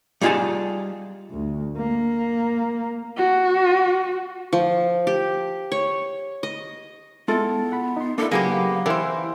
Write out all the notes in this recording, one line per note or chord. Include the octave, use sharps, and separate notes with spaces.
G3 D#4 F4 G#4 G#5 A5
D2
A#3
F#4
F3
G4
C#5
D#5
G#3 B3 E4 F4 A4
F#5 B5
D#4 C6
A#3 D4 E4 A4
C#3 F#3 A#3 B3 G4 G#4 F5
E3 E4 G4 A#4 C5